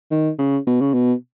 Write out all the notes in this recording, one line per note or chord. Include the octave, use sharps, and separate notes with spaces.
D#3
C#3
B2
C#3
B2